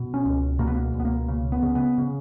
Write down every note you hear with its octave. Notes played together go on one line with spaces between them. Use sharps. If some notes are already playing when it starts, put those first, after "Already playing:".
Already playing: B2
C#4
C#2
B2 A#3
B3
A#3
C#2
B3
A#3
C#3
B3
C#3
B3
C#3